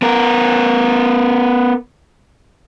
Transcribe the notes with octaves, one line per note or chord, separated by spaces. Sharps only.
B3 A#4